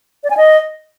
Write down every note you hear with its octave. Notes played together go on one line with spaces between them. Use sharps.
D5
G#5
D#5